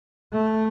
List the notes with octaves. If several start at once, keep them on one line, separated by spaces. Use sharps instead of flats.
A3